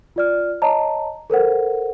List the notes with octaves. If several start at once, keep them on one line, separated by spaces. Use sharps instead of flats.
F4 D5 F6
C#5 D#5 A5 A#5
A4 A#4 C5 F#5